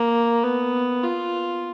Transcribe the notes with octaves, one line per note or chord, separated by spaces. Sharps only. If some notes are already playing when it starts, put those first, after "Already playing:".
Already playing: A#3
B3
F4